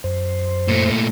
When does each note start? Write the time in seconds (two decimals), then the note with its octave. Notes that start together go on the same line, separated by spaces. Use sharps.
0.04 F#2 C5
0.68 A#2 A3